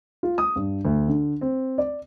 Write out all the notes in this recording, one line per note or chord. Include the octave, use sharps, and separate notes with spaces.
F4
D#6
G2
D2
D3
C4
D5